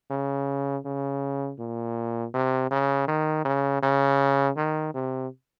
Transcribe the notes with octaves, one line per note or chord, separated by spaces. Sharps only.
C#3
C#3
A#2
C3
C#3
D#3
C#3
C#3
D#3
C3